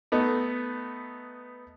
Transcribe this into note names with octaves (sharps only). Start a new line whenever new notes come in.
A3 B3 D#4